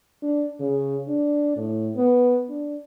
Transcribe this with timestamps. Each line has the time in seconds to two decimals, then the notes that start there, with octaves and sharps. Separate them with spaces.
0.23 D4
0.60 C#3
1.09 D4
1.57 A2
1.96 B3
2.50 D4